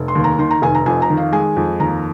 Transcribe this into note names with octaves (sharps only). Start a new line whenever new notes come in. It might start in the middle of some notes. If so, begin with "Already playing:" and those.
Already playing: F1
C6
D#2
A#5
D#3 C6
A#5
F1 G#5
A#5
F2 G#5
A#5
D#3
F5
G#3 G#5
F2
D#2 A#5